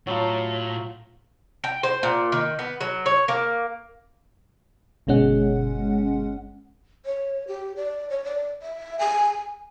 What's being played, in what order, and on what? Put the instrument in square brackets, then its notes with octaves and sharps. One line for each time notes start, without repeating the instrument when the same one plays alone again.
[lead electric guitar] A2 [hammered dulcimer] F#3 F4
[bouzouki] G5
C5
A#2
D#3
B3
F#3
C#5
A#3
[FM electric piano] G1 B2 G#3 C#4 F#5
[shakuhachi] C#5
G4
D5
C#5
D5
E5
G#5